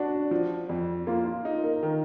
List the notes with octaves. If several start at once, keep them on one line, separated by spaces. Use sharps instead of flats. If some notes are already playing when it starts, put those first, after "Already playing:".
Already playing: D4 F#4
F3
F2
A#3 F4
F4
D#4
A#4
D#3